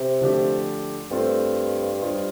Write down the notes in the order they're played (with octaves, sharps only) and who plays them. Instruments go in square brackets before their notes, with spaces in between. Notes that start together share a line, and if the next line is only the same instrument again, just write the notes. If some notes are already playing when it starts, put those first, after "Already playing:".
Already playing: [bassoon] C3
[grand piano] D3 F3 A3 D4 G4
[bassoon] G2 [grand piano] A3 C4 F4 A4 C5
[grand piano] G3 D4 F4 C5 D#5